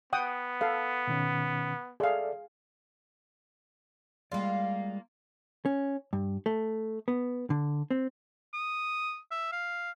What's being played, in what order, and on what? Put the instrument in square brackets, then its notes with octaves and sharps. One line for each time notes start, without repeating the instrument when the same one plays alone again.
[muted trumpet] B3 [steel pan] F#5 G5 D#6
[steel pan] A4 F5
[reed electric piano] B2 D#3 C#4
[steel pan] G#4 F5 [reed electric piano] A4 D5 E5
[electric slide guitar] G3 G#3 D5 [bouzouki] A#3 F4
[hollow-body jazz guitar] C#4
G2
A3
B3
D3
C4
[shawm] D#6
E5
F5